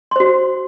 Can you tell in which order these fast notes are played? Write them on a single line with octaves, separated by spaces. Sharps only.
C6 C5 F#4